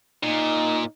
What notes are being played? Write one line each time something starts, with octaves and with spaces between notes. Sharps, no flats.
A#2 D#4